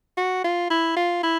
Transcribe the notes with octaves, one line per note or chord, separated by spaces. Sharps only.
F#4
F4
E4
F4
E4